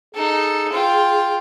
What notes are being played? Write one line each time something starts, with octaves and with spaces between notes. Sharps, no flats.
D#4 G#4 A4
F4 G5